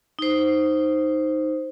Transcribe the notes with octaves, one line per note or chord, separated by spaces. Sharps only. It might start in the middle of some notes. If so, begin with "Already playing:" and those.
D#4 C5